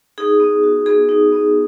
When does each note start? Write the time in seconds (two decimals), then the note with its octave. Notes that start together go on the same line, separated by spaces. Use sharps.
0.18 D#4 G#4
0.40 B3
0.63 F#4
0.86 B3 G#4
1.09 D#4
1.32 B3